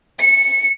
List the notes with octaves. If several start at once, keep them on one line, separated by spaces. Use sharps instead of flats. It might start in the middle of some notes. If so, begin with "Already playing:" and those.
C#7